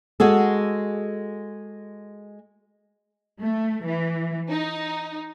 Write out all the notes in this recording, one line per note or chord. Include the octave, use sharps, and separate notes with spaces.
G#3 F#4 G#4 A4
A3
E3
D#4